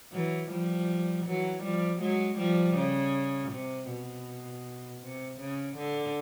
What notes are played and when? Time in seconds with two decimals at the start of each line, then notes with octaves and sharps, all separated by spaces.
0.13 E3 F#3
0.51 F3 G3
1.26 E3 F#3
1.64 F3 G3
2.01 F#3 G#3
2.38 F3 G3
2.76 C#3
3.52 C3
3.89 B2
5.02 C3
5.40 C#3
5.77 D3